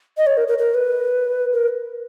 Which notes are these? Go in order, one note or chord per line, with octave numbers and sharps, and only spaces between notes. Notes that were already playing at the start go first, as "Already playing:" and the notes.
D#5
C#5
A#4
A#4
A#4
B4
A#4